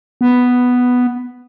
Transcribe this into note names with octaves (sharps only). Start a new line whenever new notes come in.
B3